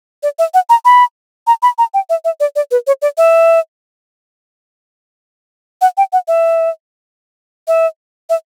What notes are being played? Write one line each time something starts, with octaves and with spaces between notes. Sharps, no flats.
D5
E5
F#5
A#5
B5
A#5
B5
A#5
G5
E5
E5
D5
D5
B4
C#5
D5
E5
F#5
G5
F#5
E5
E5
E5